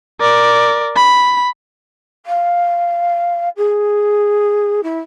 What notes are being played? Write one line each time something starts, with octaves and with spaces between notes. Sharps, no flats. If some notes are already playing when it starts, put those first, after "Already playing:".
A#4 D5
B5
F5
G#4
E4